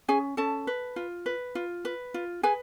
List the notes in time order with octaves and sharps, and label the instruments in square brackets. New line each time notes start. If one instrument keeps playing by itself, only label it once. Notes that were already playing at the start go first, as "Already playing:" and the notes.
[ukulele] C#4 G#4 G#5
C#4 A4 A5
B4
F4
B4
F4
B4
F4
G#4 B4 G#5